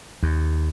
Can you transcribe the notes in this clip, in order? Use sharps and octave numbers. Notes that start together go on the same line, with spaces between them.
D#2